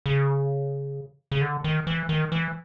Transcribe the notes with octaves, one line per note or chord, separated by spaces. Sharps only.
C#3
C#3
D3
D#3
E3
D#3
E3